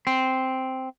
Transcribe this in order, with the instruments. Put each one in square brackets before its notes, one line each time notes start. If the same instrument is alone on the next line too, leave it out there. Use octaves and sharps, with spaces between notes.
[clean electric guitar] C4